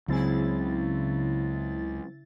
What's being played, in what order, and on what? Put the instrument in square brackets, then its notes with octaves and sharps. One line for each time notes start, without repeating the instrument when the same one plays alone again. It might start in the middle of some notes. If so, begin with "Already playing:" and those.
[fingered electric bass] C#2 [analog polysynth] C#3 E4 A6 [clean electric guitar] F#3 C4 G#4